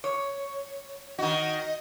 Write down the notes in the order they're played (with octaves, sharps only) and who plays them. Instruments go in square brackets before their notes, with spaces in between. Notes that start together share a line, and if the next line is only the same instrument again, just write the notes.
[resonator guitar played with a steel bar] C#5
[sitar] D#3 F#4 [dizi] D#5